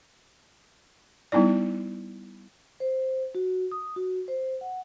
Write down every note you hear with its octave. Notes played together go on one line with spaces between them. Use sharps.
G3 B3 D#4 E4 D5
C5
F#4
D#6
F#4
C5
F#5